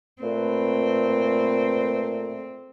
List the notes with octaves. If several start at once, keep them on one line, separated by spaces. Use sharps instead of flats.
A#2 A3 C4 B4